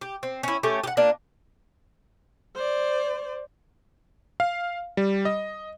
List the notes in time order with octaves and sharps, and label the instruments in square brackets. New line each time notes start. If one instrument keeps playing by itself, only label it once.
[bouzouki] G4
C4
C#4 E4
A3 C#4 G4
G4 F#5
A#3 D4 F4
[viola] C5 D5
[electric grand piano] F5
G3
D#5